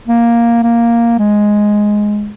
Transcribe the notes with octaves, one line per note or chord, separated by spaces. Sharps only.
A#3
A#3
G#3